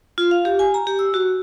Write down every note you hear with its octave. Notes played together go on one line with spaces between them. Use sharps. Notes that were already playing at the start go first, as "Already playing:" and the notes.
F4
F5
G4
G#5
A#5
G4
E6
F#4